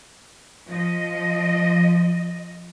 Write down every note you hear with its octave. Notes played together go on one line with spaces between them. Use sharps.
F3 D#5